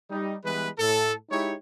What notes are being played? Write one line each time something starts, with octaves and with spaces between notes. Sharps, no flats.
G3 D#4
E3 G3 G#3 B3 B4
A2 A4
G#3 D#4 E4 G4 C#5